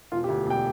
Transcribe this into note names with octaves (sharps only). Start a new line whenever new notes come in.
E1 F4
G4
D2
E1 G5